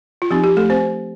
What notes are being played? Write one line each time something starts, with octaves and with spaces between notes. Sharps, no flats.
F4
F3 C4 D#4 G4
G4
A3 A4
C4 C5